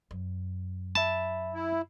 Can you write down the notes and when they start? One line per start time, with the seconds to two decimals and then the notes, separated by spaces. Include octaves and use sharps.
0.11 F#2
0.95 E5 A5 B5
1.54 E4